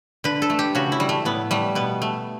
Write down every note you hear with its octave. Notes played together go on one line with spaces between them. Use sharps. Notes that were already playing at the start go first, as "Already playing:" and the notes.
D3 B4
A4
A3
G4
C#3 F#4
E4
G3
A3
A2 B3
G3 A3
B2 B3
A3